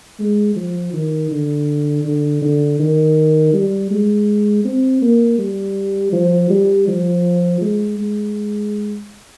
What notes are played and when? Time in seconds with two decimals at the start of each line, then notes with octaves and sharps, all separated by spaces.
0.19 G#3
0.56 F3
0.93 D#3
1.31 D3
2.05 D3
2.42 D3
2.80 D#3
3.53 G3
3.91 G#3
4.65 C4
5.02 A#3
5.38 G3
6.13 F3
6.50 G3
6.88 F3
7.61 G#3
7.98 G#3